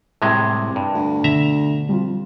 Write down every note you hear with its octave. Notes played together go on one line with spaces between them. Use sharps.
C2 A2 C3 G#3
G2
D2
B2 D3 E5 A#5
F2 G3 F4